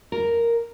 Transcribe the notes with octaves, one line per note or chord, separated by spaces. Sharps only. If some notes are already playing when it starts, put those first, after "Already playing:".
A#4